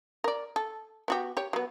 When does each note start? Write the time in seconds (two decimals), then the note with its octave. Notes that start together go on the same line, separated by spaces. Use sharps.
0.24 A#4 D5
0.56 A4
1.08 B3 F#4 G4
1.37 G4 C#5
1.53 F#3 B3